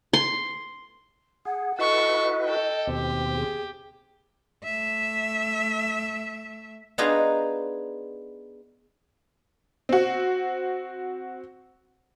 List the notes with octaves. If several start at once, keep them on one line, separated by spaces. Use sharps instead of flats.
C6
G#4 F#5
E4 F#4 A4 B4 D#5 C#6
A4 G5
D#2 B2 C4 G4
G#4
A3 E5
B3 D4 D#4 F4 G#4 A#5
C4 F#4